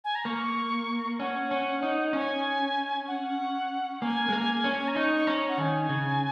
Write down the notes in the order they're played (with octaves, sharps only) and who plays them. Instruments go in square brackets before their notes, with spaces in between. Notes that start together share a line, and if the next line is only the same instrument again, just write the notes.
[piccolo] G#5
A#5
[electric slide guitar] A#3 [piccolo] C#6
[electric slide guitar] C#4 [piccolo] F#5
[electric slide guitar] C#4
D#4
[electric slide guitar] C#4 [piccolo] G#5
[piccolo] F#5
[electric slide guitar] A#3 [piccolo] G#5
[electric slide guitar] G#3
A#3
C#4
[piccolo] G#5
A#5
[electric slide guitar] D#4 [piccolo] C#6
[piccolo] C#6
[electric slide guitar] C#4 [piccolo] A#5
[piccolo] F#5
[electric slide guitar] D#3 [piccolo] G#5
[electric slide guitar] C#3